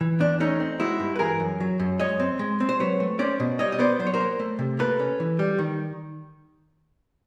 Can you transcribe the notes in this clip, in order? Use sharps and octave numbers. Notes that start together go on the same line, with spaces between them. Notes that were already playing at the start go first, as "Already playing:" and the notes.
E3
E2 D4
A3 C#4 D#4
C4
G#3 E4 F#4
G2
B4
E3 G#4 A#4
F#2
F#3
F#2
G#3 C#5 D#5
C4
G#3
C4
C5
F#3 B4 C#5
A3
C#4 C5 D5
B2
G3 C#5 D#5
D#5
B3 C5 D5
F#3 C5
C#5
A#4 C5
A#3
A3
C3
A#3 A4 B4
C#4
E3
G3
D#3